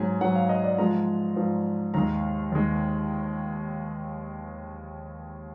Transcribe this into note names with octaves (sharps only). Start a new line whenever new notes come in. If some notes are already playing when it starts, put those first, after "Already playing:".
Already playing: G#2 F#3 G#5
G#2 F#3 F#5
F5
D#5
D5
G#2 F3 G#3 A#5
G#2 F3 G#3
D#2 D#3 G#3 A#5
D#2 D#3 G#3